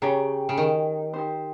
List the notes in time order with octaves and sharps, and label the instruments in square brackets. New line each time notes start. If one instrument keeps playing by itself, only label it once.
[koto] C#3 [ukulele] G4 C#5 G5 A#5
[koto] C#3
D#3
[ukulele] D#4 G4 C5